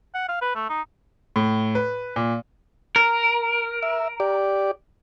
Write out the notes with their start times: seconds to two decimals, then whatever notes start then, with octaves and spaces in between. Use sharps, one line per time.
0.14 F#5
0.29 F5
0.42 B4
0.56 A3
0.70 D#4
1.36 A2
1.75 B4
2.16 A#2
2.96 A#4
3.83 E5
4.20 G4 D5